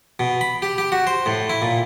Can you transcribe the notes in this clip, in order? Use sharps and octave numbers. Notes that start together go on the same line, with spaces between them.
B2
B5
G4
G4
F#4
C5
A2
E4
A#2